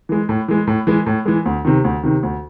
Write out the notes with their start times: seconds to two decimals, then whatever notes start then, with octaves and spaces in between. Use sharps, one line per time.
0.09 E3 G#3
0.29 A2
0.48 E3 G#3
0.67 A2
0.87 E3 G#3
1.06 A2
1.25 E3 G#3
1.46 D2
1.65 C3 D#3
1.84 D2
2.03 C3 D#3
2.23 D2